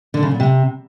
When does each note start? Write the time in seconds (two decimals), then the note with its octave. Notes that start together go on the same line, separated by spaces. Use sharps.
0.14 D3
0.23 C#3
0.31 A#2
0.40 C3